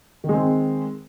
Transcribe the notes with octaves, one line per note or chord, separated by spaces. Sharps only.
D#3 G#3 C4